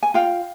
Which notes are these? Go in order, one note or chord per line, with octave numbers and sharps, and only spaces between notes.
G#5
F4 F5 G5